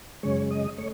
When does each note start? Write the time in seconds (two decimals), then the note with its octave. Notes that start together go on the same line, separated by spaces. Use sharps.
0.23 F#2 C#3 G#3 C#5
0.51 D#5
0.78 A3 C#5